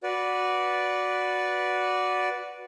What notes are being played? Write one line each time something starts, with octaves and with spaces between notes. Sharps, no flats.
F#4 B4 D5